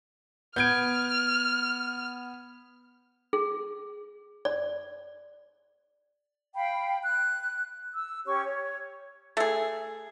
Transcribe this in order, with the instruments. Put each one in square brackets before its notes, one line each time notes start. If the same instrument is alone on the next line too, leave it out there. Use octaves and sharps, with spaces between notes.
[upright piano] B3 [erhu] F6 [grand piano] G6 G#6 D7
[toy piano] G#4
D5
[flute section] F5 G5 B5
F#6
E6
C#4 G4 C#5 C#6
C#5
[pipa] A3 G#4